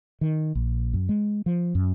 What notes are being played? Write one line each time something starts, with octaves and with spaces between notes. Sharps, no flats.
D#3
A#1
F#2
G#3
F3
F#2